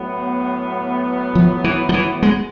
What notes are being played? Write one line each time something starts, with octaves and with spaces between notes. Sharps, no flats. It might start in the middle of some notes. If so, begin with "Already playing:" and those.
Already playing: A2 F#3 B3
F3
E3
F3
E3
G#3